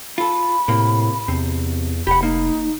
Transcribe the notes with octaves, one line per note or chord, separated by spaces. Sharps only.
F4 A4 B5
A2 C3 A#3
E2 C3
F1 G4 F#5 B5
A#3 D#4